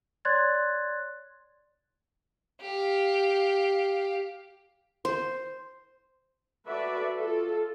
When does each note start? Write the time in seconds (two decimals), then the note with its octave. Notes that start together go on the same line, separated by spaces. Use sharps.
0.25 C#5 D5 C6 F#6 G#6 A6
2.61 G4 F5
5.05 C5
6.67 F#4 A4 B4 D5 E5
7.16 F4 A4